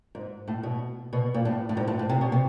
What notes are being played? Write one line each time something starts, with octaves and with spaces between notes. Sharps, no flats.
G#2
A2
B2
B2
A#2
A2
A2
G#2
A2
A2
C3
B2
C3